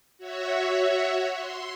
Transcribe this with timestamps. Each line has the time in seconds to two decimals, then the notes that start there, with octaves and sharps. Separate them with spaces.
0.18 F#4 C#5 E5
1.35 C6